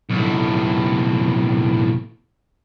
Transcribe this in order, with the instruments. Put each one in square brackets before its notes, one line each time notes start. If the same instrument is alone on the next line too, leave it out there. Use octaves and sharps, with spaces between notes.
[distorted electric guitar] B1 A2